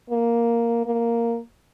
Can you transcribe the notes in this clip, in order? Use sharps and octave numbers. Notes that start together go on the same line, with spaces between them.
A#3
A#3